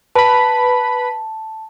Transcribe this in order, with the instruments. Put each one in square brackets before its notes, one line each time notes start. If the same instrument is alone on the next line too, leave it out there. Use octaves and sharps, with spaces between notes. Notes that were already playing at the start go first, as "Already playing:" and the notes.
[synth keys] B4 B5 [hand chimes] A5